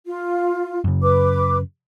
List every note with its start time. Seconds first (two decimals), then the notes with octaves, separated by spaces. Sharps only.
0.06 F4
0.84 F#2 C#3
1.02 B4 D6